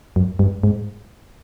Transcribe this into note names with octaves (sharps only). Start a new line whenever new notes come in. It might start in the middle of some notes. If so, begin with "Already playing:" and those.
F#2
G2
G#2